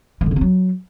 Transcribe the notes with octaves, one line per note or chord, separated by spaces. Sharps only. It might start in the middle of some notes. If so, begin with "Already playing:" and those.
G#3
D3
C#3
C4
F#3